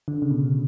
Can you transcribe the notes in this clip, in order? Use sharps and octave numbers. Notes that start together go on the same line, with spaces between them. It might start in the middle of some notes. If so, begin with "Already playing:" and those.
D3
C#3
B2